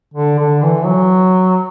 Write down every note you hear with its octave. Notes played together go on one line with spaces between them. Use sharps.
D3
D3
E3
F#3